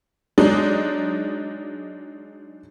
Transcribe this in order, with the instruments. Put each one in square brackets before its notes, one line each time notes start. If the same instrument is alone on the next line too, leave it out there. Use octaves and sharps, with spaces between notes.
[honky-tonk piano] F#3 G#3 D4 D#4